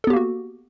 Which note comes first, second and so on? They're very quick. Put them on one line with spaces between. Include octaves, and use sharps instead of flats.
A4 B3 G4 A#3 F#4